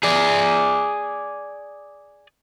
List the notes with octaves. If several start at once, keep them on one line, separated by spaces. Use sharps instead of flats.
G#4 D5